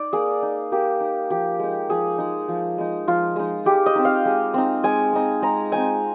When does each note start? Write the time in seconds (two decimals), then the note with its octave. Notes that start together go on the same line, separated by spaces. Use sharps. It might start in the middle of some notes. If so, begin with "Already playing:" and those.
Already playing: D#4 D5
0.13 A#3 G#4
0.42 D#4
0.72 A#3 G4
1.00 D#4
1.30 F3 G4
1.59 G#3 D#4
1.89 F3 G#4
2.18 G#3 D#4
2.49 F3
2.78 G#3 D#4
3.07 F3 F4
3.36 G#3 D#4
3.66 G#3 G4
3.86 D#5
3.95 C4 D#4
4.05 F5
4.25 G#3
4.54 C4 D#4
4.83 G#3 G#5
5.13 C4 D#4
5.42 G#3 A#5
5.72 C4 D#4 G#5